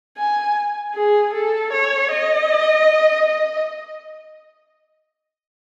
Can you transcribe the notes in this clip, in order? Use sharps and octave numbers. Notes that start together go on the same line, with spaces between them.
G#5
G#4
A4
C#5
D#5
D#5